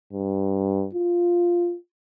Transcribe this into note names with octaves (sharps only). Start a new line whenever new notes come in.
G2
F4